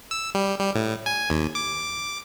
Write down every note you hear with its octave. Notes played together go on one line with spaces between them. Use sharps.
E6
G3
G3
A2
G#5
D#2
D6